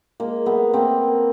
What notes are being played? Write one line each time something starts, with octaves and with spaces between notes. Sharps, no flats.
G#3 A#3
A3 B3
A#3 C4